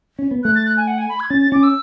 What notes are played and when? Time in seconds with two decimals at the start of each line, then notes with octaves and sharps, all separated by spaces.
0.19 C#4
0.31 B3
0.44 A3 F#6
0.55 A6
0.66 F#6
0.77 G#5
0.87 F#5
0.98 G#5
1.09 B5
1.20 G#6
1.30 C#4 A6
1.42 A6
1.52 C#4 D6
1.63 E6